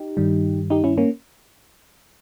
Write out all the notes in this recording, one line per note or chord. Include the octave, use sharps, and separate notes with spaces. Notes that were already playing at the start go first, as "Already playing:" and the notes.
Already playing: D#4 G4
G2 D#3 G3
D#4 G4
C#4 E4
A#3 C#4